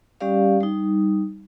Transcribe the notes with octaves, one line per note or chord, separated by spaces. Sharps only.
G3 C#4 G4 D5 F5
G3 D#4